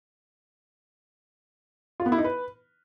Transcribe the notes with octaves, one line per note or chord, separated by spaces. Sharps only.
F4
B3
E4
D#4
B4